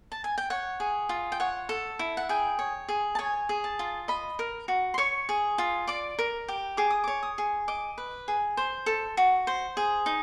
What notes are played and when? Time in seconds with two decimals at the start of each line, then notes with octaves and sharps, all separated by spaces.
0.12 A5
0.24 G#5
0.38 G5
0.50 C#5 F#5
0.80 G#4
1.09 F4
1.32 G5
1.40 C#5 F#5
1.69 A4
1.99 E4
2.17 F#5
2.29 G#4 G5
2.59 C#5
2.89 G#4
3.15 A5
3.19 C#5 G#5
3.49 G#4
3.64 A5
3.79 F4
4.08 D#5 B5
4.39 A#4
4.68 F#4
4.94 C6
4.98 C#5 C#6
5.29 G#4
5.58 F4
5.87 D5 D6
6.19 A#4
6.48 G4
6.77 G#4 D6
6.90 D#6
7.04 C#5 D6
7.23 D#6
7.38 G#4
7.68 D#5 D6
7.98 B4
8.28 G#4
8.57 C5
8.86 A4
9.17 F#4
9.47 C5
9.77 G#4
10.06 D#4